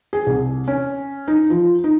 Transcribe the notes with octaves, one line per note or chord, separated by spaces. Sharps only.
G#4
C2
C#4
D#4
F3
D#4